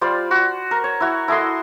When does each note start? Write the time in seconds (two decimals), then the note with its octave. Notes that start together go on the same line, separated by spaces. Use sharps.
0.01 G3 F4 C5 D5
0.31 F#4
0.71 A#4
0.84 C#5
1.00 E4 F#4
1.28 E4 A4 D#5 C6